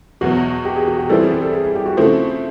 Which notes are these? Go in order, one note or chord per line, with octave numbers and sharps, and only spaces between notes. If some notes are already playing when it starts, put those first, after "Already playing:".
E2 B2 F#3 F#4
G4
G#4
F#4
G4
E3 G3 C4 E4 A4
G#4
G4
A4
G#4
G#4
G4
F#4
C#3 F3 A3 C4 E4